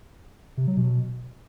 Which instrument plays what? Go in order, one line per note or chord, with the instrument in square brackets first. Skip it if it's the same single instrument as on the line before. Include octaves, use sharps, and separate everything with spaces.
[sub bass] C3
F#3
B2